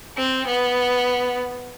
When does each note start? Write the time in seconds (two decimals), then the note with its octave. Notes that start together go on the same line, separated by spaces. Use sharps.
0.17 C4
0.47 B3